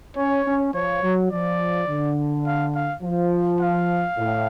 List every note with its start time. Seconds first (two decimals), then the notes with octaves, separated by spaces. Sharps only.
0.16 C#4 C#5
0.46 C#4
0.74 F3 C#5
1.03 F#3
1.31 F3 D5
1.88 D3
2.46 F5
2.75 F5
3.02 F3
3.61 F5
4.18 A2